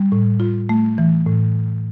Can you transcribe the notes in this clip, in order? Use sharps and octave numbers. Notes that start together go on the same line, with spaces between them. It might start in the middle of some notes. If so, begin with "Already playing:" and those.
Already playing: G3
A2
F4
A3
E3
A2